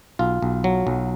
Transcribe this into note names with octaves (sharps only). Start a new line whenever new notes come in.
B1 F4
B1
F#3
B1